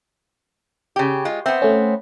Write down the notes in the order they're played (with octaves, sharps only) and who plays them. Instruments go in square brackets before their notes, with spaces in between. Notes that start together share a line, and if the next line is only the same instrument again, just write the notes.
[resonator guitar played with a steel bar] C#3 G4
G#3 F4
[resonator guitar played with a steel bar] B3 C4 [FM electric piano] E5
[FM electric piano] A3 C#4